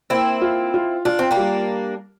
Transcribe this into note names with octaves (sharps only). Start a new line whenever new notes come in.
A#3 C4 E4
F4
F4
D4 F4
C4
A#3 D4
G3